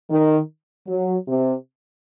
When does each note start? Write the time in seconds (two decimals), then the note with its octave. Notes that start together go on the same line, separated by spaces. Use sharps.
0.10 D#3
0.88 F#3
1.28 C3